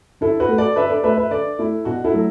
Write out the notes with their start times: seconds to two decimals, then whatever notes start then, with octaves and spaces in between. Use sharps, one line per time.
0.21 D3 E4 A4
0.40 F#4 B4
0.48 A3
0.58 A4 D5
0.76 D3 B4 E5
0.90 A4 D5
1.03 A3 B4 E5
1.17 B4 E5
1.31 D3 A4 D5
1.59 A3 E4 A4
1.85 B2 D4 F#4
2.04 E4 A4
2.14 F#3 A3